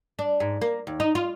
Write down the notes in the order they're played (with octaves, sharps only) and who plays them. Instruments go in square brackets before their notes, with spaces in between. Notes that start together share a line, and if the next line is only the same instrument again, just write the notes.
[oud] D4
G#2
A#3
D#2
D#4
F4